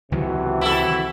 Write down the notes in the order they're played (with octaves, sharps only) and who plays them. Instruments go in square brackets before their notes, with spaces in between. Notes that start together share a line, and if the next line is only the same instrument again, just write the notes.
[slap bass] C#2 D#3 F#3 [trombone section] C3 E3 F#4
[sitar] E4 A4